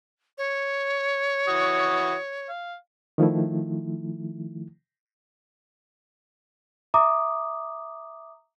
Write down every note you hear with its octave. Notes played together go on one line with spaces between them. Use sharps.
C#5
E3 F#4 D#6
F5
D#3 F3 A3 E4
E5 A#5 D6 D#6